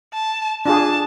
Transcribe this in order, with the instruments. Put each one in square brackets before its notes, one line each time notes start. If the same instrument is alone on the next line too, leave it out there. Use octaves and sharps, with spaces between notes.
[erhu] A5
[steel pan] D4 F4 G#4 [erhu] A5